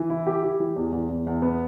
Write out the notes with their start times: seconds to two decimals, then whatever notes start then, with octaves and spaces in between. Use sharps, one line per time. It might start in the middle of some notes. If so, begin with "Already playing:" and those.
Already playing: E3
0.10 E4
0.27 G4
0.43 G4
0.60 E3
0.76 E2
0.92 E2
1.10 E2
1.27 E2
1.42 B3